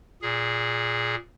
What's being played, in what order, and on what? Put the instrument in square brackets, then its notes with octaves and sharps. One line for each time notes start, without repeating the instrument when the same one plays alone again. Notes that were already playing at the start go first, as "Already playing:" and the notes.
[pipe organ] A#2 G#4